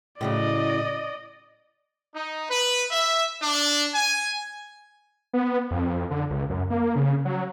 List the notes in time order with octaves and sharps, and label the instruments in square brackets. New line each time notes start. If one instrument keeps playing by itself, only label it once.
[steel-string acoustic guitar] A2 C#3 F#3 [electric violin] D5 D#5
[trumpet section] D#4
B4
E5
D4
G#5
[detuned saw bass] B3
F2
D3
C#2
F#2
A#3
C#3
F#3